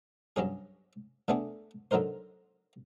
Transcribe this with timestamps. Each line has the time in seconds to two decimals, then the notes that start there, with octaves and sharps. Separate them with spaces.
0.36 G2 F#3 C#4 G#4
1.28 D3 A3 B3 D4 G#4
1.91 D3 F#3 D#4 A#4 C5